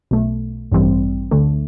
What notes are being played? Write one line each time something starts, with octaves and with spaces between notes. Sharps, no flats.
B1 B2 A3
A1 G2 E3 G3 C4
D2 D3 A3